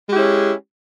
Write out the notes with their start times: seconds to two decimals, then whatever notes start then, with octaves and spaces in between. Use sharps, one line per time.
0.09 G#3
0.12 G4
0.15 E4
0.17 C#4